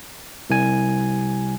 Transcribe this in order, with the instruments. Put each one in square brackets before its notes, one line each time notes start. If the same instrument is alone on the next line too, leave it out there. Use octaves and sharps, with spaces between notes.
[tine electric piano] C2 G#5